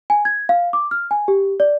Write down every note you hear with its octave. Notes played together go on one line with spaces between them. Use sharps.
G#5
G#6
F5
D6
F6
G#5
G4
D5